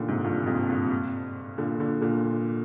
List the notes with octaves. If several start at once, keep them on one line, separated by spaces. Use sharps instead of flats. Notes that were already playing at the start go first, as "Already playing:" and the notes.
Already playing: A#2 D3 D#3
G#2 C3
G2 A#2
A#2
F2 G#2
G2
A#2 D3
A#2 D3
A#2 D3